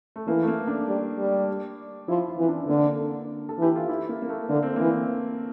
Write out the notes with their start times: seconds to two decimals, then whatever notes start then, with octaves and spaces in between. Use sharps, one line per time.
0.16 A3
0.27 E3 A#3
0.42 A3
0.48 A#3
0.68 D4
0.88 G3
1.18 G3
2.08 F3 E4
2.28 F4
2.38 E3 C4
2.48 D4
2.60 C4
2.68 D3 A#3
2.99 D4
3.49 A4
3.59 E3 G4
3.76 F4
3.89 E4
4.09 A#3
4.22 A#3
4.29 A3
4.49 D3 A#3
4.63 C4
4.76 E3 A#3